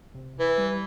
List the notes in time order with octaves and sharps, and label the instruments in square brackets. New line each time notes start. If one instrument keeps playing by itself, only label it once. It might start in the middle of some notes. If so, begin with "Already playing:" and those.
[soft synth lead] C3
[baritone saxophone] E3 [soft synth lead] B4
[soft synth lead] G3